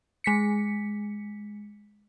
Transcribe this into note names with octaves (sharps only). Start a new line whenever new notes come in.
G#3 B6 C#7